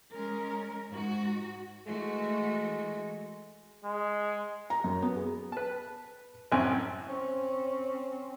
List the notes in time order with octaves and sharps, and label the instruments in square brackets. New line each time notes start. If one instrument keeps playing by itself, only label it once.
[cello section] G#3 C#4 A#4
G#2 F#4
[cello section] E3 A3 F#4 [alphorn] G#3
[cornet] G#3
[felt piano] A#5
F#2
B3
G#4
[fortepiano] B4 A5
A1 F#2 C4 G#5
[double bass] C4 C#4